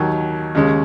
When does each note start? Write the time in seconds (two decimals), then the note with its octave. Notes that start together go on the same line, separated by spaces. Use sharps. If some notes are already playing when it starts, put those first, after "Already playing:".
Already playing: D#2 D#3 F#3
0.55 D#2 C#3 G#3 C#4